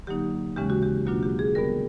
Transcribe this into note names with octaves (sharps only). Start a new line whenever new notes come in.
D3 F#3 A#3 D#4 G4
D#2 C#3 E3 G#3 C#4 G4
F#4
G4
B2 F#3 A#3 D4 F4 F#4
G4
G#4
D3 G3 B3 A#4